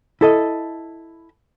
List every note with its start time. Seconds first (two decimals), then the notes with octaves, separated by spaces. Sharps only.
0.21 E4 A4 D#5